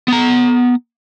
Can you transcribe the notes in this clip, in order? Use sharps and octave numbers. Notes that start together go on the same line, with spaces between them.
B3 A#5